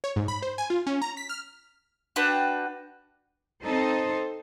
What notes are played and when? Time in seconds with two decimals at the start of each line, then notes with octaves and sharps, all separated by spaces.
0.04 C#5
0.16 G#2
0.28 B5
0.42 C5
0.58 G#5
0.70 F4
0.87 C#4
1.02 A#5
1.17 B6
1.29 F6
2.16 D4 F#4 B4 G5
3.62 C4 D#4 A4 C5